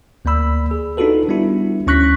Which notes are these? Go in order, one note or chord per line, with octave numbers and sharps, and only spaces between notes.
D2 A#3 D5 B5 E6
G#4
D4 D#4 F4 F#4 A4 B4
G3 B3 D4 E4 F#4
D2 C#4 C#6 F#6 A#6 B6